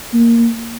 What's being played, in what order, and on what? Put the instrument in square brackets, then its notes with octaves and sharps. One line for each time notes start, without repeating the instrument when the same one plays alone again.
[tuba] A#3